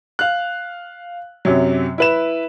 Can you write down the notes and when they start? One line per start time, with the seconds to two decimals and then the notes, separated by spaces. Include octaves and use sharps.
0.19 F5 F#6
1.45 F#2 C3 F#3
1.98 E4 B4 E7